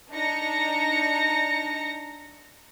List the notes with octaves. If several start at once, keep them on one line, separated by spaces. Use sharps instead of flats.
D4 D#4 A#5 A#6 C#7